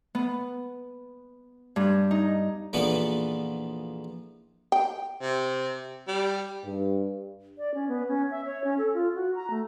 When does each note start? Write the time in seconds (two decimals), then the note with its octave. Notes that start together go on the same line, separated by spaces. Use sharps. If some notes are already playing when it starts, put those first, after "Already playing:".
0.15 B3
1.76 G2
2.11 D#4
2.73 A#1 F2 E3 B3 D4 B4
4.72 G5
5.21 C3
6.08 G3
6.64 G2
7.58 D5
7.74 C#4
7.88 B3
8.08 C#4
8.31 E5
8.45 C#5
8.64 C#4
8.78 A4
8.94 F4
9.15 F#4
9.35 A#5
9.50 A3